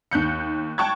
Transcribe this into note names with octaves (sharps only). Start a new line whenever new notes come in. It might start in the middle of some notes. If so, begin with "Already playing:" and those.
D#2 F#6 G6 C#7
G5 A5 C#6 F#6 G#6